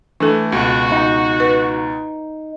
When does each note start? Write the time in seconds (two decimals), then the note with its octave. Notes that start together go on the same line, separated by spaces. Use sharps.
0.20 E3 A3 D4 A4
0.52 C#2 B2 F#4
0.92 D#4
1.40 B4